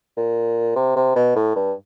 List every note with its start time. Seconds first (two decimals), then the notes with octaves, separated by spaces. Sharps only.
0.17 A#2
0.76 C3
0.96 C3
1.16 B2
1.36 A2
1.56 G2